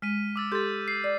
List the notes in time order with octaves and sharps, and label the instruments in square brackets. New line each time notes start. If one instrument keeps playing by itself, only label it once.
[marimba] G#3 [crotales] F6 B6 D#7
[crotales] D6 E6 A6
[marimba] G4 A4 C6 [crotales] G6 A6
[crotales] C7
[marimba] D5